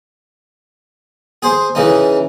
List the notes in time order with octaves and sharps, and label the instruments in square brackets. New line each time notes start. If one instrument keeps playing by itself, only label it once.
[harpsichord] G#4 C5
C#3 E3 D#4